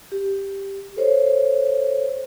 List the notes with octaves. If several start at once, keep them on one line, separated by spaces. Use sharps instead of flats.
G4
A4 C5 C#5